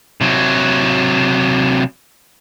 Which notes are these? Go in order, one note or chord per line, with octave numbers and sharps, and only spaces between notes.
C3 F#3